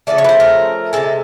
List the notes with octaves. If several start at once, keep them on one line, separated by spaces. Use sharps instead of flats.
C#3 F3 A3 D5
C#5
B4
C5
A#4
C3 F3 G#3 A4